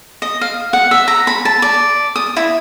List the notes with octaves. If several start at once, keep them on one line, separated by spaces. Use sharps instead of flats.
D#5
F5
F#5
E5
A#5
B5
A5
D5
D#6
E4